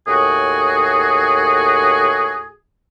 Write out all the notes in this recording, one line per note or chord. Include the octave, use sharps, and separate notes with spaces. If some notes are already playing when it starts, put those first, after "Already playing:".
D#2 A2 F#4 G#4